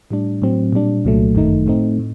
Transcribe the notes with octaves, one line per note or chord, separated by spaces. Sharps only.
A2 G3 D4
A2 F#3 C4
A#2 G3 D4
C2 A#2 F#3 A3
G1 F#2 D#3 A3 D#4
A2 A3 C4 D#4
A2